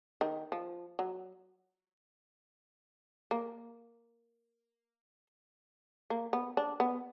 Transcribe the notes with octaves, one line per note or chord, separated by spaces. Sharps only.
D#3
F3
F#3
A#3
A#3
B3
D4
B3